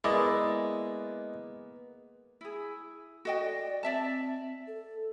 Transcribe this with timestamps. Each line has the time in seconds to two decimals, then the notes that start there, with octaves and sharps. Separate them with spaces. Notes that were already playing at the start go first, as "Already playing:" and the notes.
0.04 G#3 A#3 B3 E4 D5 D#5
2.41 E4 G#4
3.25 F#4 A4 D#5 G5
3.42 D5
3.83 C4 D5 E5 A5
4.67 A4